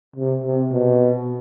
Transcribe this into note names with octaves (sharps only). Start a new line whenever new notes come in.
C3
C3
B2